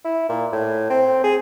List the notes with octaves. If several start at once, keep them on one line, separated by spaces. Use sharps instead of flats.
E4
A#2
A2
C4
G#4